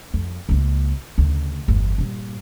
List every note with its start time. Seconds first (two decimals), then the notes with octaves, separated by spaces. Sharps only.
0.14 F2
0.49 C#2 A#3
1.18 D2 C#3
1.68 G1 E2
1.98 G2 A#2